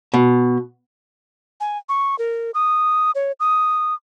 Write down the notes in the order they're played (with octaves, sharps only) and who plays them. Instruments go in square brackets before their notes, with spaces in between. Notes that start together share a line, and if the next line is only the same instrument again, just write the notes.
[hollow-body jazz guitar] B2
[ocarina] G#5
C#6
A#4
D#6
C#5
D#6